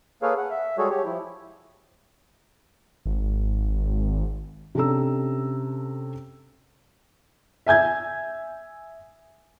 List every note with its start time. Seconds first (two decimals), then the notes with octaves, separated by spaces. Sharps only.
0.22 A#3 G#4 A4 B4 C#5 F5
0.38 F#5
0.50 E5
0.78 G3 G#3 F#4 G#4 A4 C#5
0.90 G4 C#5
1.05 F3 E4
3.06 G#1
4.75 C3 C#4 D4 A4 A#5 E6
7.67 E5 G#5 G6 G#6